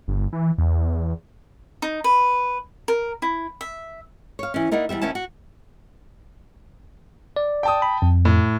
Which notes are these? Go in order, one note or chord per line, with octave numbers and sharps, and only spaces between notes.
G1
E3
E2
D#4
B4
A#4
E4
E5
C#5 F5
E3 C#4
A#3 D#4 E4 D5 F#5
E2 C3 G3 E5
D#2 B3 C#4 E4 A5
F#4
D5
G5 A5 D#6
B5
F2
A2